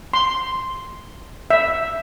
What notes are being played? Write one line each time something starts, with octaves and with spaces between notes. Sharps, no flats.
C6
E5